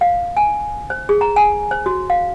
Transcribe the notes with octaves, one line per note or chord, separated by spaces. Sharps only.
F5
G#5
C5
G#4
A#5
G#5
C5
F#4
F5